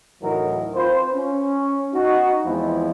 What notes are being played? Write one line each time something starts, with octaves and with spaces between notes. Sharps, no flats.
D2 A2 E3 F#3 D#4 A#4
C4 F4 B4 C5
C#4
D#4 F#4
E2 E3 F3 G#3 C4 E4